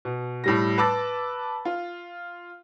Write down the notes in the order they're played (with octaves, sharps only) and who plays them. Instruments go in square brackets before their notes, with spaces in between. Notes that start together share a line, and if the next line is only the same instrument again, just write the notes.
[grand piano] B2
A2 G3 A#6
B4 A5 D6 E6 A6
F4